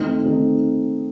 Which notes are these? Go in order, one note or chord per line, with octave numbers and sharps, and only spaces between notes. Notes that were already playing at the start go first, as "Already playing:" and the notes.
Already playing: D#3 A3 C4 D#4
D#3 A3 C4 D#4